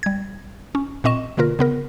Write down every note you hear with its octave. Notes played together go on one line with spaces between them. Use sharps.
G3 G#6
C#4
A#2 C4 D#5 C#6 E7
B2 D3 A#3 F4 A#4
C#3 B3 A#4